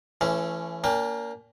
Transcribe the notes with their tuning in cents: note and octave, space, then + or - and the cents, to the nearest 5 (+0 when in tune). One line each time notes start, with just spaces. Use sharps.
E3 +35 A3 +0 C#4 +0
A#3 +0 D4 -45 G5 +35